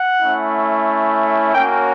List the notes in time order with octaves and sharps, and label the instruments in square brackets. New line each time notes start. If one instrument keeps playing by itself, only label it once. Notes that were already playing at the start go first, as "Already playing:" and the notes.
Already playing: [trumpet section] F#5
A3 C#4 E4
A#3 C#4 F#4 G5